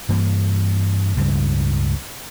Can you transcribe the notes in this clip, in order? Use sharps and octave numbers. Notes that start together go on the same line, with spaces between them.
G2 E3 A#3
C#2 G2 C#3